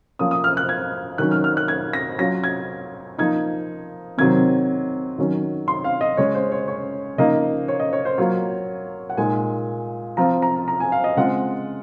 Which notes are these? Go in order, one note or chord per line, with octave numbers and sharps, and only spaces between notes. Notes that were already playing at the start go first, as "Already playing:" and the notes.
F3 A#3 C#4 D#6
D#6
F6
F#6
G#6
D#3 F#3 C#4 F#6
F6
F6
F#6
G#6
A#6
F#3 C#4 F4 A#6
G#6
F3 A#3 D#4 G#6
C3 D#3 F#3 C4 G#6
D#3 F#3 C#4
C6
F5
D#5
C#3 G#3 C#4 C#5
C5
C#5
C#5
C#3 F3 A#3 D#4 D#5
C#5
D#5
C#5
C5
F#3 A#3 F4 C#5
F#5
A#2 G#3 D#4 G#5
F3 C4 F4 A#5
A#5
A#5
G#5
F5
D#5
C#3 G#3 C4 F4 F#5